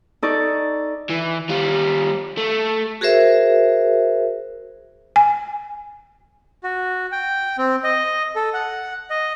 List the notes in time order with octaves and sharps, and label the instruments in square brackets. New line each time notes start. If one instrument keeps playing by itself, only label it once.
[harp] D#4 A4 D5 C#6
[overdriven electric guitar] E3
G3 F4
A3
[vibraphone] F#4 G#4 A#4 C5 E5
[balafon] G#5
[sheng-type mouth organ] F#4
G5
C4
D#5
A4
F#5
D#5